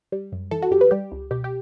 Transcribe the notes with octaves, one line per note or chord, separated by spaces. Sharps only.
G3
F#2
E3 A4
F#4
F#2 G4
B4
G3 G4
C#2
B2 G4
G4